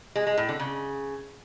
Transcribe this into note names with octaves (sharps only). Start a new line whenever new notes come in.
G#3
G#3
A2
D3
C#3